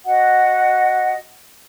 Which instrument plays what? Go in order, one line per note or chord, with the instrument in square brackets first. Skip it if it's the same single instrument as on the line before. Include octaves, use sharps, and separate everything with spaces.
[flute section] F#4 D#5 F#5